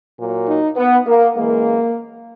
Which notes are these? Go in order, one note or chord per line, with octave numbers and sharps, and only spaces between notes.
A#2 F#3
D#4
B3
A#3
F#2 E3 G#3 A#3